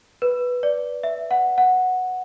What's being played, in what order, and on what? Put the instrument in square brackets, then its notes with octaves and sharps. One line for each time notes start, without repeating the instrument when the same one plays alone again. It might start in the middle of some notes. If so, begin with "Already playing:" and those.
[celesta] B4
D5
E5
F#5
F#5